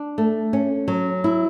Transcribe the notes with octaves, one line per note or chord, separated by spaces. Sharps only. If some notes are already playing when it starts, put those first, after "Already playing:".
Already playing: D4
A3
C#4
F#3
E4